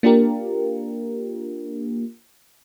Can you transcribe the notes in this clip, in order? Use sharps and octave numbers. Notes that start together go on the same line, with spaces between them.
A#3 D4 F4 G4 A#4